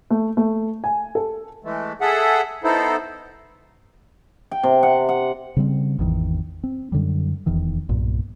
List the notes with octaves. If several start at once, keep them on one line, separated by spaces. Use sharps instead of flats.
A3
A3
G#5
A4
E3 G#3 A3
G#4 A4 E5 F#5
B3 D#4 E4 A4 C5
G5
C3
F#5
F#5
C#3 G3 C4
G#1 E2 D#3 E3
C4
F#2 D3 F#3 G3
D#1 E2 D#3 E3
B1 G2 A#2